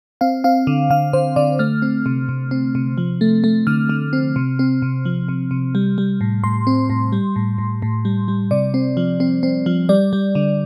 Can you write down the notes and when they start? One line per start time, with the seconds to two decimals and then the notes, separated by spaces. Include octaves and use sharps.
0.21 C4 F5
0.44 C4 F5
0.67 D3
0.90 D3 F5
1.13 D3 C5
1.36 D3 D5
1.59 A3 F6
1.82 C4
2.06 C3
2.29 C3
2.51 C4
2.75 C3
2.98 F3
3.21 A3
3.44 A3
3.67 D3 F6
3.89 D3
4.13 C4
4.36 C3
4.59 C4
4.82 C3
5.05 F3
5.28 C3
5.51 C3
5.75 G3
5.98 G3
6.21 A2
6.44 A2 C6
6.67 C4
6.90 A2
7.12 G3
7.36 A2
7.58 A2
7.82 A2
8.05 G3
8.28 G3
8.51 C3 D5
8.74 C4
8.97 F3
9.20 C4
9.43 C4
9.66 F3
9.89 G3 D5
10.13 G3
10.35 D3